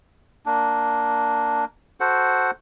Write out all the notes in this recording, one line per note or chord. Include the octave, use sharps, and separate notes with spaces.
A#3 D4
F#4 A4 C5 F#5